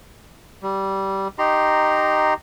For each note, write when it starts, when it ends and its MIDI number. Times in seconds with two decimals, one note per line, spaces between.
0.63 1.28 55
1.39 2.34 63
1.39 2.34 67
1.39 2.34 82
1.39 2.34 84